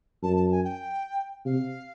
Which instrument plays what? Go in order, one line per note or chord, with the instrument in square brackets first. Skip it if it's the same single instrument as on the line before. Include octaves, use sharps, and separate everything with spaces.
[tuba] F#2 [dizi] A5
[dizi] A5
G#5
G5
[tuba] C3 [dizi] F5